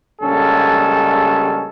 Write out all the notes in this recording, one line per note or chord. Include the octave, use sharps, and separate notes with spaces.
A#1 G2 C#3 G#3 C#4 A4